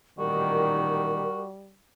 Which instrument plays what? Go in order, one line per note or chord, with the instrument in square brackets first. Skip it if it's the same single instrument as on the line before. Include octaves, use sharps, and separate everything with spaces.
[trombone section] A1 A#2 D#3 [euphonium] G3 [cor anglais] F#4 [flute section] A#4